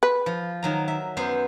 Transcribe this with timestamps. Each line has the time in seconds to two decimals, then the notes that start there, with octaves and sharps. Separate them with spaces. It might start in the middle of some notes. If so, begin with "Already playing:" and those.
0.03 B4
0.26 F3
0.63 D#3 F#3 A#5
0.88 E5
1.17 F#2 B3 C5